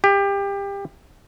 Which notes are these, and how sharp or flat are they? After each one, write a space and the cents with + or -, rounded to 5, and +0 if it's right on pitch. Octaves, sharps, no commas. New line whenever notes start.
G4 +25